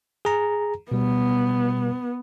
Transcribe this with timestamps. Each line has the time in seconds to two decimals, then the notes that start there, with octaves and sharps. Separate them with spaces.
0.25 G#4 A#5
0.92 B2 G3 B3